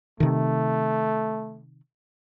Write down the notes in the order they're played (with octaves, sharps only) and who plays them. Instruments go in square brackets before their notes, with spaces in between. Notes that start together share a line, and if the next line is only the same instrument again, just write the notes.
[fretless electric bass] C3 D#3 [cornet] A3